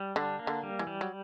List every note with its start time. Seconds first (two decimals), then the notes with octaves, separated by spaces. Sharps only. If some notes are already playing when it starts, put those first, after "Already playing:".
Already playing: G3
0.16 D3 D4
0.39 A#3
0.47 D3
0.63 G3
0.79 E3
0.87 G3
1.01 F#3